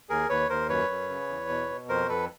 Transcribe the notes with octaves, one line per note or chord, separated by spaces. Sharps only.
D#2 G#4 A#4
D#2 B4 C#5
D#2 A#4 C5
F#2 B4 C#5
F#2
C#3
E2
B2
B2
F2 A#4 C5
F2 A4 B4